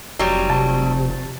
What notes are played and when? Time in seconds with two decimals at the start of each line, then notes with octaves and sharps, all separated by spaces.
0.19 F1 F#3 G3
0.50 C3 A5